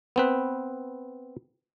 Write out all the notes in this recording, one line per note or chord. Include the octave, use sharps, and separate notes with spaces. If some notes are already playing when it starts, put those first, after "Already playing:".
B3 C4 B4